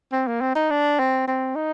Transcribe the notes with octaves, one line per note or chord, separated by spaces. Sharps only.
C4
A#3
C4
D#4
D4
C4
C4
D#4